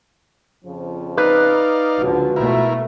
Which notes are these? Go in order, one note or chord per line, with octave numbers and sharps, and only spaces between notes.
F2 C#3 F3
D#4 B4 D5 F5
C#2 D3 F3 F#4
B2 G#3 A3 E4 A#4